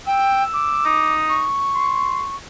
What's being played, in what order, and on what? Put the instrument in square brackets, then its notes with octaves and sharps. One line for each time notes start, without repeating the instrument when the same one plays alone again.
[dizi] G5 [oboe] E6
[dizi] D6
[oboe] D#4
[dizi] C#6
[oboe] C6